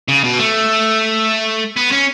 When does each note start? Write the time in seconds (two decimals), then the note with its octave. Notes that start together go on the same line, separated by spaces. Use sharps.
0.08 C#3
0.24 B2
0.39 A3
1.76 B3
1.91 C#4